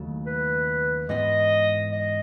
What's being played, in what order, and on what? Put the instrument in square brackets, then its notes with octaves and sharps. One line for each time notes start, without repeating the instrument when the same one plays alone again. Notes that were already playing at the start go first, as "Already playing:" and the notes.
Already playing: [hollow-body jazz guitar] D#2 C#3 F#3 A3 E4
[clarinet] B4
[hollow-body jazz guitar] G#2 E3 B3 [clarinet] D#5
[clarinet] D#5